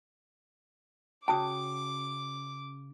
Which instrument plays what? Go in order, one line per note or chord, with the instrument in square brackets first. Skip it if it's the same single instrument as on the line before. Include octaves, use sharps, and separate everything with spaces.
[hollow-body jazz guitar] C#3 F#4 G5 [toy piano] A5 D#6 [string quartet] D6